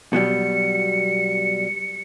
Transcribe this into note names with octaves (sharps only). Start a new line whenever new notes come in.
B2 F#3 G3 C#7